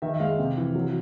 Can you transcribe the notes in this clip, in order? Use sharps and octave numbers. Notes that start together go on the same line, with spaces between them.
D#3 E5
E5
G#3 F5
C3
E3
F#3